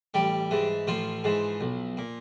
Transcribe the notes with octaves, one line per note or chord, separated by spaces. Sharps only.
A1 G3 G4
G#2 E3
A1 F3 F4
G#2 E3
B1
A#2